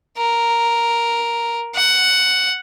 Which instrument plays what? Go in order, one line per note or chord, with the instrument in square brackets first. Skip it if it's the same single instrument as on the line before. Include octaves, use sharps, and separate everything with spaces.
[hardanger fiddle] A#4
F#5